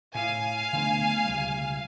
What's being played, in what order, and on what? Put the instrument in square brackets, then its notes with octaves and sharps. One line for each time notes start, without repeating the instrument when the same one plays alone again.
[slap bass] A2 [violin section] F5 G#5
[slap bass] D3 A3 B3
C#2 G3